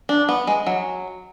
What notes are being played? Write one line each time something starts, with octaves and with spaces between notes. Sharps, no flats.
D4
B3
G#3
F#3